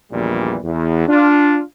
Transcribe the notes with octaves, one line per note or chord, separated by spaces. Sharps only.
A#1 E2 A#2 D#3 E3 G3
E2
D4 F4